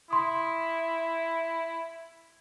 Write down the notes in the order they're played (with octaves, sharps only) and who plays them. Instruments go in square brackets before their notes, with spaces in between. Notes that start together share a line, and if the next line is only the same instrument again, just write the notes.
[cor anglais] E4 [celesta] C6 D#6